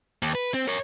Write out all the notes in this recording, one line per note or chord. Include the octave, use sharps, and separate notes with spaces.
D#2
B4
C4
A#4 C#5